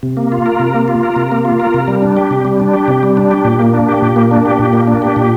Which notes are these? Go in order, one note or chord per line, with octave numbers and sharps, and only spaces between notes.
C3
A#3
F4
A#4
C3
A#3
F4
A#4
C3
A#3
F4
A#4
C3
G3
D4
G4
C3
G3
D4
G4
C3
G3
D4
G4
A#2
A#3
D4
G4
A#2
A#3
D4
G4
A#2
A#3
D4
G4
A#2